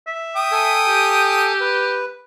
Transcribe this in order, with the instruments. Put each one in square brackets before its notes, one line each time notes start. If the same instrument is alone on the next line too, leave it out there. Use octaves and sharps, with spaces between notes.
[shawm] E5
[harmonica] G5 D#6
[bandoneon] A4 G#5
[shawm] G4
[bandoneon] B4